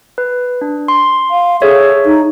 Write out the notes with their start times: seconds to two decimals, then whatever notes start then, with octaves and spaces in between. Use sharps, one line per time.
0.18 B4
0.61 D4
0.88 C6
1.31 F5
1.62 G#4 A4 C#5 E5
2.05 D#4